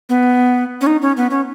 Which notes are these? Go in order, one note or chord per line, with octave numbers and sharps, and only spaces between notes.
B3
C#4
D#4
C#4
B3
C#4